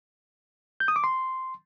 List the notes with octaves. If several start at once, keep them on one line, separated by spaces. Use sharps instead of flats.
G6
D#6
D6
C6